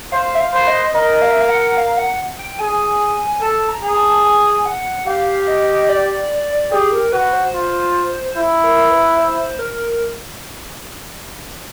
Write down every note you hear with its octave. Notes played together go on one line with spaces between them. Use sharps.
C5 F5
E5
F5
C5
D#5
A#4 D#5
F5
E5
F5
F#5
F5
F#5
G5
G#4 G#5
A4 A5
A#5
G#4
A5
G#5
F#5
G4 F5
D#5
D5
G4 G#4
A#4
F#4 B4
C5
F4
E4
A#4
B4
C5
A#4